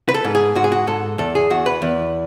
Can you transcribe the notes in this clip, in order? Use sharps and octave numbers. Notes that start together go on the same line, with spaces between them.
B4
A4
G#2
G#4
G#2 F#4
G#4
F#4
G#2 A4
E2 A4
G#4
E2 F#4
B4
E2